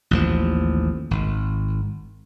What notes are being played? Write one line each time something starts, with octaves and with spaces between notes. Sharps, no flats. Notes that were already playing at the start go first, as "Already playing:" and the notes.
A1 D#2 F3
G#1